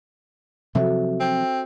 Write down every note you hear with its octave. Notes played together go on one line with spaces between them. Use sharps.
C3 F3 F#3 F#4 A4 E5
C4